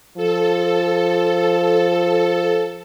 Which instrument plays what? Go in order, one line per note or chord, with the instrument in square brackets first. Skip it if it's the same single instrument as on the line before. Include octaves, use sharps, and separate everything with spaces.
[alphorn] F3 [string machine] A4